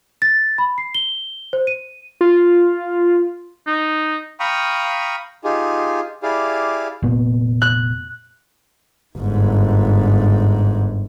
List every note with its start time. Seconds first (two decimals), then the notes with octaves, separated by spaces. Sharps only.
0.22 A6
0.58 B5
0.78 C7
0.95 G7
1.53 C5
1.67 D#7
2.21 F4
3.67 D#4
4.40 F5 G5 A#5 B5 C#6 D#6
5.44 D#4 F4 G4 G#4
6.23 E4 G4 G#4 D5 F5
7.03 F1 A#2 B3
7.62 F#6
9.16 G1 G#2